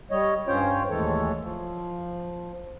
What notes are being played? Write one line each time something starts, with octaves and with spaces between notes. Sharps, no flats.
G3 C#5 D#5
G2 C#4 F4 C5 C#5 G5
D#2 A2 E3 G#3 A4 C#5
F3